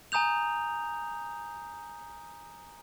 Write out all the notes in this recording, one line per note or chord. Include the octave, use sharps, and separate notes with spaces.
G#5 A#5 D#6 G6 F7